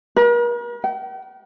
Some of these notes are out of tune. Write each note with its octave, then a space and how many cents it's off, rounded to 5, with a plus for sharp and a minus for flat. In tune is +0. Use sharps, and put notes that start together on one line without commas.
A#4 +45
G5 -45